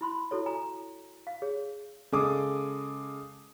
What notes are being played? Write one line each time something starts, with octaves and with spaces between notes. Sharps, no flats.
E4 B5 C6
E4 F#4 A4 C#5
G#5 A#5
F5
G#4 C#5
C#3 G#3 A4 D6 D#6